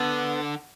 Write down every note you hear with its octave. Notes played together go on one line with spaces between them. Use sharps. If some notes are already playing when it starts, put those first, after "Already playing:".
Already playing: D3 B3